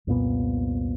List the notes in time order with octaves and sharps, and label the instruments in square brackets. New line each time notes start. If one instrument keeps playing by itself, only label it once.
[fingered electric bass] C2 F2 A#2 B3